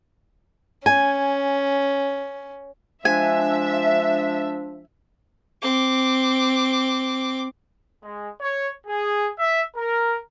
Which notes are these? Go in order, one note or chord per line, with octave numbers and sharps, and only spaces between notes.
C#4 G#5
F3 G#3 D4 E5 G#5
C4 D6
G#3
C#5
G#4
E5
A#4